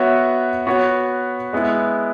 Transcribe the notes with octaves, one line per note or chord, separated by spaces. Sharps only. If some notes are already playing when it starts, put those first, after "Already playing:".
Already playing: B3 F#4 C#5 E5
B3 F#4 C#5
G#3 B3 E4